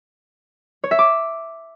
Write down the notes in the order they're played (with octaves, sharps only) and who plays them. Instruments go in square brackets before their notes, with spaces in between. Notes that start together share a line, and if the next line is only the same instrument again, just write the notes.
[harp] C#5
E5
D6